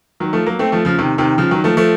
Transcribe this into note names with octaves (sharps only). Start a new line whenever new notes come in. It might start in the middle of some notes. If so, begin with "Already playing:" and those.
D#3 F#3
F3 A3
F#3 A#3
A3 C4
F3 A3
C#3 F3
C3 D#3
C3 D#3
C#3 F3
D#3 F#3
F3 A3
F3 A3